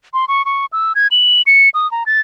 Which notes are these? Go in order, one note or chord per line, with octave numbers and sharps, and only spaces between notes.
C6
C#6
C#6
E6
G#6
F#7
C#7
D#6
A#5
A6